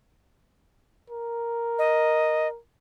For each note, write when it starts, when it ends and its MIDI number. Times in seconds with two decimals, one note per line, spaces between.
1.10 2.59 70
1.79 2.48 75